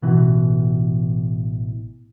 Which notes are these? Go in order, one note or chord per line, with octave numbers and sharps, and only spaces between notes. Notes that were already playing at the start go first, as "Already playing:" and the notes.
A1 B2 E3